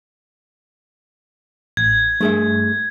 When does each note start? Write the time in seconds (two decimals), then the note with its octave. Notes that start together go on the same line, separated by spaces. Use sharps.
1.77 A1 G#6
2.21 G2 A3 G#4 E5